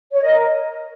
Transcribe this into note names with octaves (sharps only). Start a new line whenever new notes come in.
C#5
A#4 D#5